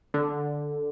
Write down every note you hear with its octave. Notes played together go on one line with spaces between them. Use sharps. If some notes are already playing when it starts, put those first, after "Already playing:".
D3